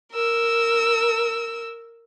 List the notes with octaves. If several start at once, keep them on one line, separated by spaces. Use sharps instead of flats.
A#4 E6